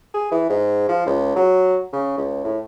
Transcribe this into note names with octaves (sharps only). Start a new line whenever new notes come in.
G#4
E3
G#2
F3
C#2
F#3
C#3
C#2
A2